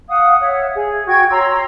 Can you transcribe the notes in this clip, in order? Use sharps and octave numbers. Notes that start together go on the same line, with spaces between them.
F5 F#5 D#6
C#5 E5 F#5
G#4
F#4 G5 C#6 G#6
C#5 A#5 C6 E6